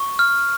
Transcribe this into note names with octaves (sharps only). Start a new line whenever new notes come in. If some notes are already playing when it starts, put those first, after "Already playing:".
Already playing: C#6
F6